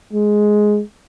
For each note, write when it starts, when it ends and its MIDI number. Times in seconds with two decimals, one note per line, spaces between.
0.13 0.81 56